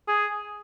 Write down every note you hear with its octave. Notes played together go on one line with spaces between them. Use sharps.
G#4